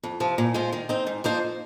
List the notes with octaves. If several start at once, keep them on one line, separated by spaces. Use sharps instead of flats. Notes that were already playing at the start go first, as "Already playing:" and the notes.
F2
C3 F3
A#2
G#3 F4 C5
D#3
C4 D#4
G#2
F3 A#3 D#4 C5